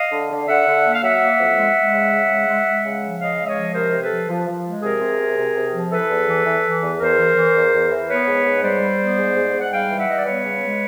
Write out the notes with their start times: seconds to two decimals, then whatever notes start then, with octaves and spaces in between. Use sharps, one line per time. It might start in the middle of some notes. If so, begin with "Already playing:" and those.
Already playing: D#5 F5
0.12 D3
0.30 D3
0.48 D3 E5 F#5
0.66 D3
0.84 A#3
0.94 F5
1.02 F#3 E5 F#5
1.21 A#3
1.39 F2
1.57 G#3
1.75 G#3
1.93 C#3
2.11 C#3
2.29 G#3
2.48 G#3
2.65 G#3
2.83 C#3
3.02 F3
3.19 C#3 D#5 F5
3.38 G#3 E5
3.46 C#5 D#5
3.55 F3
3.74 C3 A#4 C5
3.92 C3
4.01 A4 B4
4.11 F3
4.28 F3
4.46 F3
4.65 G#3
4.83 C3 G#4 A#4
5.01 C3
5.19 C3
5.37 C3
5.55 C3
5.73 F3
5.91 E3 A4 B4
6.10 E2
6.27 E3
6.45 E3
6.64 E3
6.82 E2
6.99 E2 A#4 C5
7.18 E3
7.36 E3
7.54 E2
7.73 E2
7.91 E3
8.09 B3 B4 C#5
8.26 G#2
8.45 G#2
8.63 G3 C5 D5
8.82 G3
8.99 B3
9.17 G#2
9.36 G#2
9.53 G#2
9.60 F#5
9.72 G3 F5 G5
9.90 E3
9.98 E5 F#5
10.08 G3 D#5
10.18 D5
10.26 B3 B4 C#5
10.44 C#3
10.62 G#3